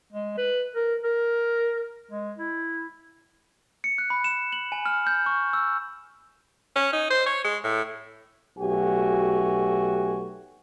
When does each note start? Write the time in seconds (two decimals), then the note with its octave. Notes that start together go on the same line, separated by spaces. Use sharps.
0.13 G#3
0.38 B4
0.75 A#4
1.04 A#4
2.11 G#3
2.38 E4
3.84 C#7
3.98 F#6
4.10 B5
4.24 E7
4.53 F#7
4.72 G#5
4.86 F6
5.07 G6
5.26 C#6
5.53 E6
6.76 C#4
6.93 D#4
7.10 C5
7.26 C#5
7.44 G#3
7.64 A2
8.58 B1 A3 F#4 G4 G#5